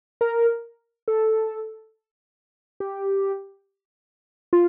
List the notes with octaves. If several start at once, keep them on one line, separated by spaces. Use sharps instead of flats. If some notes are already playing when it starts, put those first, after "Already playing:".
A#4
A4
G4
F4